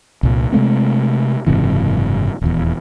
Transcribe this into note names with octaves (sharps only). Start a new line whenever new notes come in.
C2 A#2
C3 G#3 A3 C4
F#1 G#2 C3 E3
D#1 E2